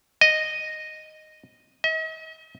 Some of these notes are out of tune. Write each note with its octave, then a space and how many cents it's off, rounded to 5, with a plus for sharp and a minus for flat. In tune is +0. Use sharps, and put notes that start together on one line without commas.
D#5 -5
D#5 +45